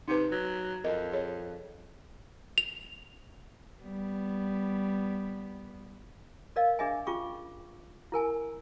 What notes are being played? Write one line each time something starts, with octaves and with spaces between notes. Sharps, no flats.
C3 D#4 B4
F#3
F2 A#4 D#5
G#4 C#5
F7
G3 B3
A#4 D5 D#5 F5
D4 G#4 D#5 E5 G#5
C#4 F4 G#4 C#6 D6
E4 A#4 G#5 A5